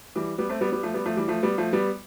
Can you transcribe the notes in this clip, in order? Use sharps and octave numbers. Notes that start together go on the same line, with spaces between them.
E3 G3
G3 B3
A3 C4
G3 B3
G3 B3
F3 A3
G3 B3
F3 A3
E3 G3
F3 A3
G3 B3
F3 A3
G3 B3